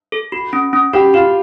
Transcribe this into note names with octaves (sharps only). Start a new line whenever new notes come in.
A4
F#4
C#4
C#4
F#4 G4
F4 F#4